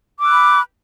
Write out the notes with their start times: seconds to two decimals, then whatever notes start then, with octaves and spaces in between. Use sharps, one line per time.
0.19 D6
0.23 E6
0.28 F#6
0.32 B5